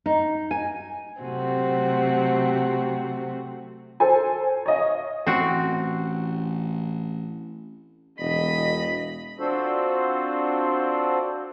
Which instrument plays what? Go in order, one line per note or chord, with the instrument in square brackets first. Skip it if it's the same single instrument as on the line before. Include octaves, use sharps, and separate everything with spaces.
[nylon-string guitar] D#4
G#5
[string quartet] C3 F#3 A3 C4 F#4
[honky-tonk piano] A4 C5 G#5
C#5 D#5 F5
[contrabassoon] A1 [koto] C4 F#4
[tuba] E1 [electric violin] D#5 B6 [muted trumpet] B5
[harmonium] C4 D4 F4 F#4 A4 C5